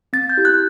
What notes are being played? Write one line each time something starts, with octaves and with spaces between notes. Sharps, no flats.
C4 A6
G6
E4 G4
F#6